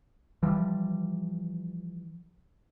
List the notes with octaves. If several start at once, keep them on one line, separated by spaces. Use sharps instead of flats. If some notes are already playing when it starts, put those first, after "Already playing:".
E3 F3 G3